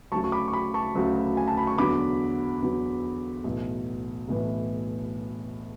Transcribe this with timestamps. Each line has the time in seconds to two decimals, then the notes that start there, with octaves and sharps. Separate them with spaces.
0.12 D2 C#3 F#3 A5 C#6
0.24 C#6
0.32 B5 D6
0.48 C#6
0.53 B5 D6
0.74 A5 C#6
0.95 D2 C#3 F#3
1.37 G#5
1.48 A5
1.57 B5
1.67 C#6
1.78 E2 D3 F#3 B5 D6
2.62 E2 D3 F#3
3.44 B1 A2 E3
4.28 B1 A2 E3